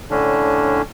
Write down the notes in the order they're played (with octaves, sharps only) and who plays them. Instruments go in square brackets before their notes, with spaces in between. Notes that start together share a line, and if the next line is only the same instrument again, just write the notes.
[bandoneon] A2 D3 C#4 D4